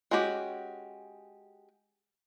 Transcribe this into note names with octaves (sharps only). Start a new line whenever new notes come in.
G#3 C#4 F#4 G4